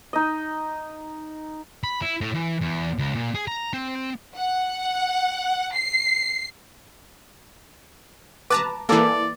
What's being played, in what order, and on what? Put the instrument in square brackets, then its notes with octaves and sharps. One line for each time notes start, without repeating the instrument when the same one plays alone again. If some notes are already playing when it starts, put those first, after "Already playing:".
[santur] D#4 D#5
[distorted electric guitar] B5
E4
A2
E3
E2
C#2
A#2
G#4
A#5
C4
[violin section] F#5
C7
[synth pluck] B4 A5 A#5 [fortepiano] D6
[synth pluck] E3 A#3 [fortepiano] A4 D6 [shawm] D5